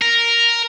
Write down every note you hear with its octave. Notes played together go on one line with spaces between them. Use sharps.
A#4